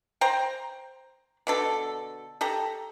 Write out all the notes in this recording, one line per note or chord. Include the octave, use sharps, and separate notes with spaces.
C5 G5 A#5
B2 D3 A4
G4 A4 A#5